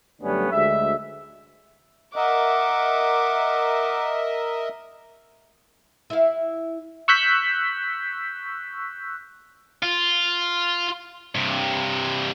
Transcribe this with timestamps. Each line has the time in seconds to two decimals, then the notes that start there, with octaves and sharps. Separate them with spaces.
0.21 F#2 D3 G3 A3 B3 C#4
0.52 D2 G#3 E5
2.16 A#4 D#5 E5 F#5 D6
6.10 E4 F5
7.08 C#6 E6 F#6 G6 B6
9.83 F4
11.35 G2 C3